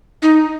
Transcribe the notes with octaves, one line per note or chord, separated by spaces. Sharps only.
D#4